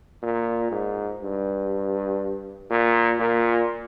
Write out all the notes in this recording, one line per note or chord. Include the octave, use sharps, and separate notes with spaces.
A#2
G#2
G2
A#2
A#2